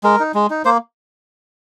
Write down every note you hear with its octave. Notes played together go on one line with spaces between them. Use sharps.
G#3 A#4
D#4
G#3
D#4
A#3 C5